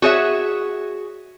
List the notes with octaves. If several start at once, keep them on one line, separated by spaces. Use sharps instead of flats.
F#4 G#4 C#5 E5